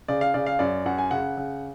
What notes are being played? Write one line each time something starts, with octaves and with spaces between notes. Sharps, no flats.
C#3 D5
F5
C#3 D5
F5
F#2 D5
F#2 F#5
G#5
C#3 F#5
C#3